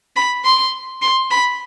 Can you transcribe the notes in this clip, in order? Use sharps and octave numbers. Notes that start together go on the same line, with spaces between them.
B5
C6
C6
B5